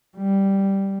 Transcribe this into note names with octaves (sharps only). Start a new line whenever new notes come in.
G3